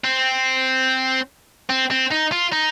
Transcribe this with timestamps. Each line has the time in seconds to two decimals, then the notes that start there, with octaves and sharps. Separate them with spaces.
0.04 C4
1.69 C4
1.91 C4
2.11 D#4
2.31 F4
2.52 D#4